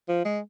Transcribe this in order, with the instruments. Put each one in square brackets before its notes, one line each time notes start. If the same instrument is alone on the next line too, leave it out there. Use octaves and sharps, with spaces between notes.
[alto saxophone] F3
G#3